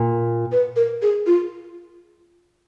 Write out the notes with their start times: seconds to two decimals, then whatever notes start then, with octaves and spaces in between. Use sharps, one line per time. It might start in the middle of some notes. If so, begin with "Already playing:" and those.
Already playing: A#2
0.52 B4
0.76 A#4
1.02 G#4
1.27 F4